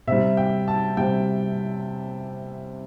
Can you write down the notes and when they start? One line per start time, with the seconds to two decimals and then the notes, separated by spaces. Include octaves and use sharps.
0.07 C3 G3 E5
0.37 G5
0.68 A5
0.97 C3 G3 G5